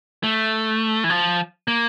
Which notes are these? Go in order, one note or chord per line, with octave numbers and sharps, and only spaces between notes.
A3
E3
F3
A#3